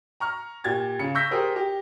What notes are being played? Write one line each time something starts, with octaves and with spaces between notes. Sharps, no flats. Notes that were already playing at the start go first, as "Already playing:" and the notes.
A#5 C#6 F6
A#2 G4 G#6 A6
C#3 C#7
C#6 E6 G6 A#6 B6
G4 G#4 A#4 C5
G4